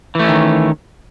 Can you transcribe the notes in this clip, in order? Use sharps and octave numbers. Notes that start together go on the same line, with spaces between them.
D#3 E3 A3 C#4